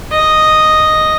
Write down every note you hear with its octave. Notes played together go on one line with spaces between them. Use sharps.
D#5